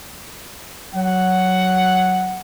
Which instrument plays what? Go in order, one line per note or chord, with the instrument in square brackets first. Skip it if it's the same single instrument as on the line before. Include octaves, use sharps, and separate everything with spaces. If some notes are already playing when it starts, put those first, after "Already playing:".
[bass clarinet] F#3 [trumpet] F#5